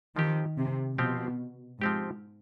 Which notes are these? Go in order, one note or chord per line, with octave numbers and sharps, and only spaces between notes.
D#3 F3 C4 G4
C3
B2 F3 C4 G4
G#2 F3 C4 G4